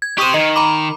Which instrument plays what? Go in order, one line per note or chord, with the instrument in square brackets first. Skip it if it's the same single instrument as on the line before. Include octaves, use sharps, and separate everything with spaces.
[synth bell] G#6
[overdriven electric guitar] G4 C5 [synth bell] C#6 D#6 D#7
[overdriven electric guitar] D#3 [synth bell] D#5
[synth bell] A#5 B5 D6